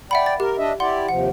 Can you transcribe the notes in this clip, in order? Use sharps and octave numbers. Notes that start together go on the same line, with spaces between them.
D5 E5 F#5 G5 B5
A6
G4 A#4
D4 D#5 E5
E4 G4 D5 F#5 C6
D#2 C3 F3 F#5